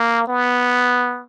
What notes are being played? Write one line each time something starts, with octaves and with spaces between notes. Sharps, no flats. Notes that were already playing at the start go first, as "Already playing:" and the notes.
Already playing: A#3
B3